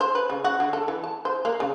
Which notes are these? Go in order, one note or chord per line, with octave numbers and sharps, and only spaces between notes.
C5
B4
C#3
F#4
D3
A4
E3
A5
C5
A#3
C#3